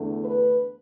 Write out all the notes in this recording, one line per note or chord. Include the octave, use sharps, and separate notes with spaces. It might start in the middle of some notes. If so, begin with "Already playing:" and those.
Already playing: E2 D3 A3
B4